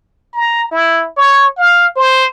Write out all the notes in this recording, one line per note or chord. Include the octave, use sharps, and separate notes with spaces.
A#5
E4
C#5
F5
C5